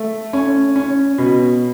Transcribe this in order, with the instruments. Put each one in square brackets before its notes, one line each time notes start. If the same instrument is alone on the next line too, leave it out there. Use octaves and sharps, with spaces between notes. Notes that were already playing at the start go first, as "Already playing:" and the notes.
Already playing: [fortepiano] A3
C#4
C#4
B2